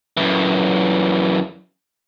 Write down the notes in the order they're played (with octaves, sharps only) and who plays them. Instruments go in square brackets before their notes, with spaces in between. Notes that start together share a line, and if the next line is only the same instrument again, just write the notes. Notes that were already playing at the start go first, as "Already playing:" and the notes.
[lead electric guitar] F#2 E3